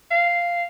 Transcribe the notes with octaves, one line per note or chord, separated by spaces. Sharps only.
F5